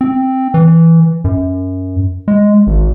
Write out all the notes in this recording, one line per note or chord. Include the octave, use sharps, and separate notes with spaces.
C4
E3
F#2
G#3
G#1